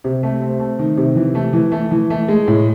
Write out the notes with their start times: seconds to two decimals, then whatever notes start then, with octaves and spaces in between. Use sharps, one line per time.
0.04 C3
0.23 A3
0.42 C4
0.60 A3
0.79 D#3
0.97 C3
1.16 E3
1.35 A3
1.53 E3
1.72 A3
1.91 E3
2.10 A3
2.28 G#3
2.48 A2